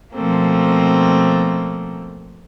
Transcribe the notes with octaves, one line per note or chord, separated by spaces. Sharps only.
B2 F3 A3 A#3 C4